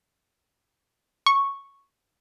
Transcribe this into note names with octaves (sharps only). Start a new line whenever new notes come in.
C#6